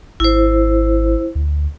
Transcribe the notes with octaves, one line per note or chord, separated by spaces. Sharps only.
G#1 E4 C5
D2